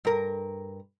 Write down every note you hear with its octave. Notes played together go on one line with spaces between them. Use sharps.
G2 A#4